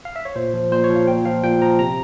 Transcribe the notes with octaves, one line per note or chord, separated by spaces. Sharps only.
F5
E5
C#5
A#2 C5
F3
A#2 C5
C#5
F3
F5
A#2 G5
F3 F5
A#2 G5
F3 A#5
C3 A#5